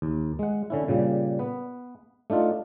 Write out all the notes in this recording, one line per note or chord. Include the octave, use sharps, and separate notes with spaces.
D#2
G#3 F#5
D3 C#4 E4
A#2 C#3 G3
B3 B4
A3 D4 D#4 F4